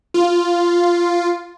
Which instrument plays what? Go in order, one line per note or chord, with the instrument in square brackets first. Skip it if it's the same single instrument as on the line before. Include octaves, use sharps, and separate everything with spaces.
[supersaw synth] F4